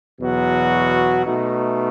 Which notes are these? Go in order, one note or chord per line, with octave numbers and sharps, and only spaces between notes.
E2 B2 F#3 B3 F#4
B2 A3 D#4